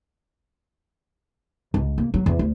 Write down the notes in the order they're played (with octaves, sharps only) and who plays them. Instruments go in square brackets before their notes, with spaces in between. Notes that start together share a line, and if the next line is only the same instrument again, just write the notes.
[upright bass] C#2
A#3
F#3
E2
D2